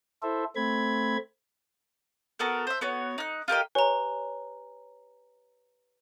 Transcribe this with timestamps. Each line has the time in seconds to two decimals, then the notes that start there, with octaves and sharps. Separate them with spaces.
0.22 E4 A4 C5 E5
0.56 A3 C4 B5 G#6
2.39 B3 F#4 A4 A#4
2.67 C5 E5
2.81 B3 F#4 C#5
3.18 D#4 F#6
3.48 F4 G4 A#4 D#5
3.75 G4 B4 C#5 G#5 A#5